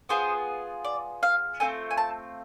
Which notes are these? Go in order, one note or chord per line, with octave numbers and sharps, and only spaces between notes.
B3 F4 G#4 C5
D5
F5
A3 C4 F4 G#5
G#5
A5